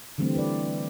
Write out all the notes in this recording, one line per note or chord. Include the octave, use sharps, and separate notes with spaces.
D3 E3 G3 A3 C4
B4 D5